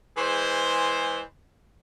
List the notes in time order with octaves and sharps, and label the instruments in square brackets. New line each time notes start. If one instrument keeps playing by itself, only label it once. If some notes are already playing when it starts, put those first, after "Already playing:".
[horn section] E3 G#3 G#4 C5